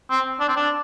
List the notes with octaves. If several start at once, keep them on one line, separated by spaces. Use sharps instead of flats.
C4
D4
C4
D4